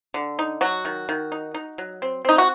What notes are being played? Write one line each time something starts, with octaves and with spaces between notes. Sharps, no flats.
D3
D#4
F#3 F#4
D#3
D#3
D#4
D#4
F#3
C4
C4 D#4
F#4